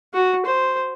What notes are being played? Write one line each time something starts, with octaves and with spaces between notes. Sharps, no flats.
F#4
C5